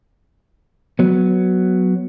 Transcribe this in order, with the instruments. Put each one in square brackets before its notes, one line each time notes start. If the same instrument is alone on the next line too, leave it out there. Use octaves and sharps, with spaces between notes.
[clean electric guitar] F#3 B3